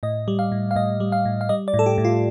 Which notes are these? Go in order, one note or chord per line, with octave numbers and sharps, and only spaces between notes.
A2 D#5
G3
F5
A2
F5
A2 D#5
G3
F5
A2
F5
G3 D#5
D5
A2
A4
G4
A2
F4